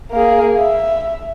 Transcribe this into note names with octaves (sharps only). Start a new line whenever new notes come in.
A#3 G#4
E5